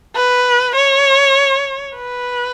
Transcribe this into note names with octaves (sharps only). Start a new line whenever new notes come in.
B4
C#5
B4